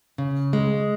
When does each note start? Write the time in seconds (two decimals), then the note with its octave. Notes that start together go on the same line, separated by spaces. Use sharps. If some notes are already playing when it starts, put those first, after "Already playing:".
0.18 C#3
0.53 G#3